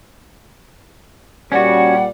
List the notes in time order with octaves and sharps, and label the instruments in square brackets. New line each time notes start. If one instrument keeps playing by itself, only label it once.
[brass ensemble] A#2 G3 [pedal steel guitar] C#4 F#4 [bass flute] D5 [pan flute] F#5